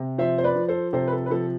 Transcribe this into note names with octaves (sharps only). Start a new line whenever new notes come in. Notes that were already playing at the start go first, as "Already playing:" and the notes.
Already playing: C3
F3 C5 E5
C5
B4 D5
F3
A4 C5
C3 A4 C5
B4
A4
B4
F3 A4